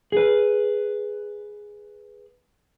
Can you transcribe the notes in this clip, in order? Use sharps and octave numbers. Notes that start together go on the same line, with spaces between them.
G#4 B4